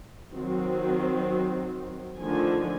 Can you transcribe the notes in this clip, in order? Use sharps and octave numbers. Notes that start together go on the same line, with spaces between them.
D#3 F#3 C4
D3 D#3 F3 A3 G#5